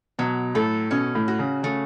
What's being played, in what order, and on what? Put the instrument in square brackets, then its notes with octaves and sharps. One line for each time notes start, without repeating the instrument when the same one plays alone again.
[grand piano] B2 [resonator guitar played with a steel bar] F#3
[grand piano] A2 [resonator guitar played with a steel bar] A4
[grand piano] B2 [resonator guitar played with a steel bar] C#4
[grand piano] A2
[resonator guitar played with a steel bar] F#4
[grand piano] C#3
[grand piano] C#3 [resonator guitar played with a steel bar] A3